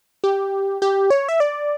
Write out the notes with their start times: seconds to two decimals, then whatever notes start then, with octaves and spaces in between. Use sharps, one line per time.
0.24 G4
0.82 G4
1.10 C#5
1.29 E5
1.40 D5